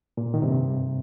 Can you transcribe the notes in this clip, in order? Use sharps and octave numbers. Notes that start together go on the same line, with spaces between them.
A#2
D#3
G2 C3